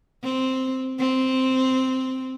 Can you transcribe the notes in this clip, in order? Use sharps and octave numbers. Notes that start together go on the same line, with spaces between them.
C4
C4